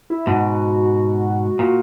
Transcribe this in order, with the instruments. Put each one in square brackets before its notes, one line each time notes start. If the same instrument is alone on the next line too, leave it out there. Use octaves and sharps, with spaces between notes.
[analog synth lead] E4
[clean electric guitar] G#2 B2 [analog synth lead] F#4
[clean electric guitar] A#2